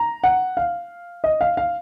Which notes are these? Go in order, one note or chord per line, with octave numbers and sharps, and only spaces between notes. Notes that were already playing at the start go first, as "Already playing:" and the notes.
Already playing: A#5
F#5
F5
D#5
F5
F5